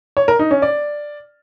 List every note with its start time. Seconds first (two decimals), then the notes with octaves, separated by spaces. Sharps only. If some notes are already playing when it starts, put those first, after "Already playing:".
0.17 C#5
0.28 A#4
0.39 D#4
0.51 C#4
0.62 D5